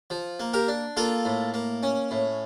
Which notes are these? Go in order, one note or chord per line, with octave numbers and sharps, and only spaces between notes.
F3
A#3
G4 A#4
D4
A#3 F4 A4
A2
A#3
C#4
A2